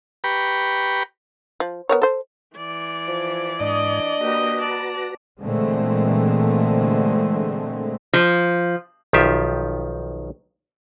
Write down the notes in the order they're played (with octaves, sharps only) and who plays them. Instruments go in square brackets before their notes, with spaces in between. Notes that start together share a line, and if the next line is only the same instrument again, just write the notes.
[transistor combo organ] G4 B4 G5 A#5 B5 C#6
[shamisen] F3
B3 A#4 C#5
A4 C5
[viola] E3 D5
[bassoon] F3
[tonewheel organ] G#2 [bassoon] D4 [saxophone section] D#5
[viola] A#3 G4 [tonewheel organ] F#4 B4 A#5
[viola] D5 A5
[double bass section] A#2 D3 E3 G#3 A3 C4
[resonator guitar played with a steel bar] F3
[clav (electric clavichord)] B1 D#3 F3 F4 G4 E5